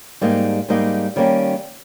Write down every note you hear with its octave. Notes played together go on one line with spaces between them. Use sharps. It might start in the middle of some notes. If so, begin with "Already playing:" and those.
G#2 G3 A#3 D#4
G#2 G3 A#3 D#4
D#3 G3 A#3 C#4